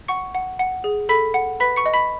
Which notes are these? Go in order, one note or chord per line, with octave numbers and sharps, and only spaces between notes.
F#5 C#6 C#7
F#5
F#5
G#4
A4 B5 B6
F#5
B4 B5 B6
C#6 C#7
D#5
B5 B6